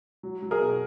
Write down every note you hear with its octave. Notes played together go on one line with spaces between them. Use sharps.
F#3
F#3
G#4 A#4
B2